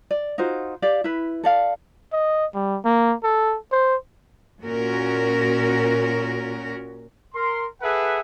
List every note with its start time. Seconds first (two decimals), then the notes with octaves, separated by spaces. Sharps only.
0.11 D5
0.38 D#4 F4 F#4 C5
0.82 G4 D5 F5
1.04 E4 B4
1.44 A4 D5 F5
2.13 D#5
2.54 G3
2.85 A#3
3.23 A4
3.72 C5
4.63 A#2 C#4 F#4 A#4
7.35 A#4 C6
7.82 G#4 A4 B4 E5 F#5